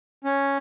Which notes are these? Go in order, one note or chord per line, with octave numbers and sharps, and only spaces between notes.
C#4